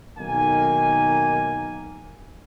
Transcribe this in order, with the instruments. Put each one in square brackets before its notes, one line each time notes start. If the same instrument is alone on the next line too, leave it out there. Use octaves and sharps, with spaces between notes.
[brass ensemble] B1 D#3 A#3 G#5